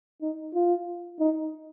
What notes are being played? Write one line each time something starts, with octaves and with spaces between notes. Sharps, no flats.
D#4
F4
D#4